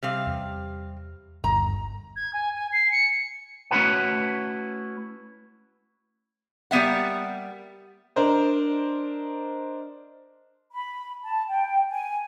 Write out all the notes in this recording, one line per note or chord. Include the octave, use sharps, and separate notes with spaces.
C3 G3 F5 F6
E2
G1 D#2 A#5
G#6
G#5
G#5
C7
C#7
A3 C#4 E4 F#4 B4 F#5
G3 A#3 B3 E5 F#5
D4 A#4 C5 D#5
B5
A5
G5
G#5